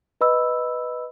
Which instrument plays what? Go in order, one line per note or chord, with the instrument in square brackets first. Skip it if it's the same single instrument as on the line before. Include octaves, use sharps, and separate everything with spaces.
[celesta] B4 D#5 B5 E6